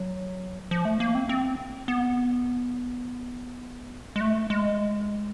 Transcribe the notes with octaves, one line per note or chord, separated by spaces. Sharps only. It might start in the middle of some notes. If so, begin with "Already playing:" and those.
Already playing: F#3
F3
A3
A#3
C4
C4
B3
G#3
A3
G#3